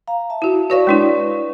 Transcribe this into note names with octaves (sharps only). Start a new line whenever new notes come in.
F5 A#5
E5 A5
E4 F#4
F#4 B4 C#5 D5 F5 C#6
G#3 D4 E4